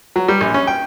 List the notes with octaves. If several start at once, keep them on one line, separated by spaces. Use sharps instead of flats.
F#3
G3
A#1
C#4
G5